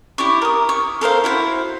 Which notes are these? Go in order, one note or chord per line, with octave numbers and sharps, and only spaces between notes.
E4 G4 D5 C#6
A#4 D#6
C#6
A4 A#4 C5 F5
E4 F#4 C5